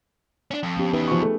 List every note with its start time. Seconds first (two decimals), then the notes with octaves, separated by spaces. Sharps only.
0.51 C#4 D4
0.63 F2
0.77 B3 C#4 G4
0.93 E2 D#4 B4 E5
1.08 F3 C#6
1.22 A3 G#4